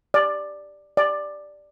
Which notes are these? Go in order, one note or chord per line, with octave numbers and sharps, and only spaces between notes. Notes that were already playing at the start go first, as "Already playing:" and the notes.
D5
D5